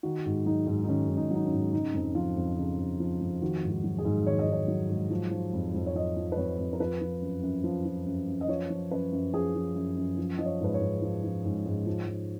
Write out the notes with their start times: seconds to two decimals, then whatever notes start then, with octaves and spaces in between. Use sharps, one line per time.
0.03 D#3 F#4
0.25 G#2
0.46 F#3 D#4
0.67 G#2
0.84 D#4
0.89 D#3 C#4
1.09 G#2
1.17 D#4
1.31 F#3 D#4
1.45 C#4
1.52 G#2
1.73 C#3 D#4
1.94 F2
2.15 F3 F4
2.36 F2
2.58 C#3
2.78 F2
3.00 F3
3.20 F2
3.42 D#3 F#4
3.63 G#2
3.69 F#4
3.84 F#3
3.98 G#4
4.05 G#2
4.26 D#3 C#5
4.39 D#5
4.47 G#2
4.52 C#5
4.68 F#3
4.89 G#2
5.10 F3
5.31 F3
5.53 F2
5.74 F2
5.86 C#5
5.95 F3 D#5
6.17 F3
6.32 B4
6.37 F2 C#5
6.59 F2
6.73 A#4
6.80 F3 B4
7.01 F3
7.22 F#2
7.43 F#2
7.64 F3
7.85 F3
8.06 F#2
8.28 F#2
8.41 D#5
8.48 F3 C#5
8.70 F3
8.91 F#2 B4
9.12 F#2
9.33 F3 G#4
9.55 F3
9.75 F#2
9.97 F#2
10.17 F3
10.38 F3 D#5
10.46 C#5
10.60 G#2 B4
10.74 C#5
10.81 G#2
11.02 F3
11.24 F3
11.45 G#2
11.66 G#2
11.86 F3
12.07 F3